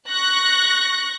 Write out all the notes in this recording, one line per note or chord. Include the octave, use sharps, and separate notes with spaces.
C#6 F#6 A#6